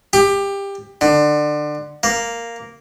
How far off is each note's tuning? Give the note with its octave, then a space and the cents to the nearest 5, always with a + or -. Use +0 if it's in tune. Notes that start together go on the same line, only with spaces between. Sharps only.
G4 +20
D3 +25
A#3 -5